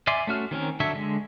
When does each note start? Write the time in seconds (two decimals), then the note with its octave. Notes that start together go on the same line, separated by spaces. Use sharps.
0.07 D5 E5 G#5 C6 D6
0.27 A3 C#4 F#4 F6
0.51 D#3 C4 C#4 A#4
0.80 D3 F#3 A4 C#5 E5
0.95 D3 G#3